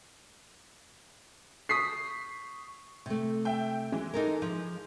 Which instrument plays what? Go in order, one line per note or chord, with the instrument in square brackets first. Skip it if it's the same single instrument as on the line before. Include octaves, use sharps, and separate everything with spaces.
[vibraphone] C#6 [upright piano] D#6 B6 C7
[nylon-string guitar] C3 A3
[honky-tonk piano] E5 G5
E3 G#3
[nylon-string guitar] D#4 A4 A#4
F3